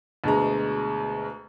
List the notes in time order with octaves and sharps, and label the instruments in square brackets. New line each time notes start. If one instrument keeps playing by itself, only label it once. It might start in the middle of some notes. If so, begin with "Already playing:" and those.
[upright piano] D2 B2 G#3 A#5